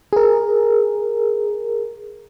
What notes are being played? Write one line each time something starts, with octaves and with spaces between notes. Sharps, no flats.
G#4 A#4